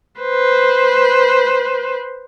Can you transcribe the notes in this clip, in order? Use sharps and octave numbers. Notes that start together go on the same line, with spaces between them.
B4 C5